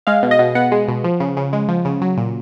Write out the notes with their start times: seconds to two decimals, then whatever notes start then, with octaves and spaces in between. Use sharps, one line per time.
0.07 G#3 F5
0.23 B2
0.31 D#5
0.39 B2
0.55 B3 F#5
0.72 G#3
0.88 B2
1.04 F3
1.20 C#3
1.37 C#3
1.53 G#3
1.68 F3
1.85 C#3
2.01 F#3
2.17 A#2